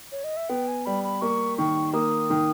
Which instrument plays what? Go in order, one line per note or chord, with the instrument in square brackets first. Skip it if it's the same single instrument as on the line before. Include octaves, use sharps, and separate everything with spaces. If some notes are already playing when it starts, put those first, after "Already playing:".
[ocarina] C#5
D#5
E5
[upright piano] B3 [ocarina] G5
[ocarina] G#5
[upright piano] G3 [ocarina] B5
[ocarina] B5
[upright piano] A#3 [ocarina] C#6
[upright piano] D#3 [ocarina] C#6
[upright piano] A#3 [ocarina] D#6
[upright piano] D#3